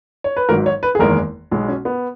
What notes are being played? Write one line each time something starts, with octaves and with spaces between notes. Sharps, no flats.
C#5
B4
G#1 G#2 F#3 A#4
C#5
B4
G#4
F#1 E2 D#3 G#3 A#4
B1 B2 G#3
C#4
B3